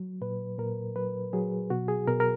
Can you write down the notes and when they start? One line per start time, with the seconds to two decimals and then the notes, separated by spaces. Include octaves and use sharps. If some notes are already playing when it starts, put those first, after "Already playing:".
Already playing: F#3
0.21 A#2 B4
0.59 A#2 A#4
0.96 F#3 B4
1.33 F#3 G#4
1.70 B2 F#4
1.88 G#4
2.08 B2 A#4
2.20 A#4